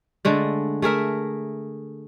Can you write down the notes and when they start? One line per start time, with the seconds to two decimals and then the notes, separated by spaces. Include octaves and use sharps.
0.25 D3 G#3 A3
0.82 A3 G#4 A#4 E5